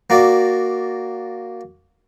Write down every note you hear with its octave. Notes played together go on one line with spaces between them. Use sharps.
A#3 F#4 D5